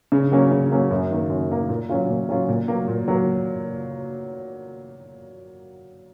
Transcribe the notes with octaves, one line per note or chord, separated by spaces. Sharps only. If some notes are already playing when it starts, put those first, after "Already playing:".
C#3
F#3 A#3 C#4
C#3
F#3 A#3 C#4
F#2
D#3 A#3
F#2
D#3 A#3
A#2
F#3 C#4 F4
A#2
F#3 C#4 F4
A#2
F#3 A#3
A#2
F#3 A#3